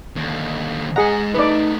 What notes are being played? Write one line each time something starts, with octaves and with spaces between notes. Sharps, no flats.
D#2 D3
G#3 G#4 D#5 F#5 A#5
A3 B3 D#4 B4 D5